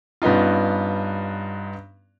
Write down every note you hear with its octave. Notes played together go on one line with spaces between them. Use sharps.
G2 B3 C#4 D#4 F4